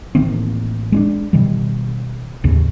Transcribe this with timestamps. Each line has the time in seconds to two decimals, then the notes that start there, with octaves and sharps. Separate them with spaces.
0.15 A1 D#3 A#3 C4
0.92 G#3 C#4 D4
1.33 B2 D#3 G3
2.44 A1 D#2 C#3